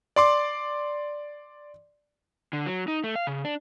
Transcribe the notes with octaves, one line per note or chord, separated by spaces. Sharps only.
D5 C6 D6
D3
F#3
D#4
A3
F5
C#3
D4